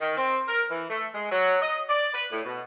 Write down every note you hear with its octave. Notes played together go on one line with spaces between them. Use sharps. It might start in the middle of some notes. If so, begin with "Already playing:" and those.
D#3
C4
A#4
E3
A3
G#3
F#3
D#5
D5
B4
A2
B2